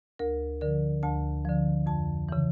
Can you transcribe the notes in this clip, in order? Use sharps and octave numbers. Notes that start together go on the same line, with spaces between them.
D2 A#4
D3 F3 A#4
D2 A5
D3 F3
F2 A5
C#3 E3